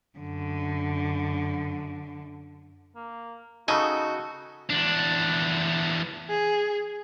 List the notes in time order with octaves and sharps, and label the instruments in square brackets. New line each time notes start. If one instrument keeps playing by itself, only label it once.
[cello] F#2 D3
[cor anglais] A#3
[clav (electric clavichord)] C#3 G#5 [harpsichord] D#4 [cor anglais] F#4 [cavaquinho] A4
[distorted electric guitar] E2 D4
[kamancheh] G#4